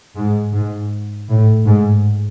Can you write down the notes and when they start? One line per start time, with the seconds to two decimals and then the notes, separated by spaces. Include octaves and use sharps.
0.16 G#2
0.53 G#2
1.29 A2
1.65 G#2